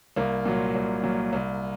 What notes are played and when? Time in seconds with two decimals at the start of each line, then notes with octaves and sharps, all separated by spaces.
0.16 C2 A#3
0.45 A#2 F#3
0.75 C2
1.03 A#2 F#3
1.33 C2